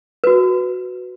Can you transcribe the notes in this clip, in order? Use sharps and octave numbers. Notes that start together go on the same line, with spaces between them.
F#4 B4